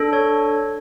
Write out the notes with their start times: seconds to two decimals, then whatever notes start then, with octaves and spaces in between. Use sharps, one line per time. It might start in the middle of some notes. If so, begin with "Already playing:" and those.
Already playing: D4 A4
0.13 C#5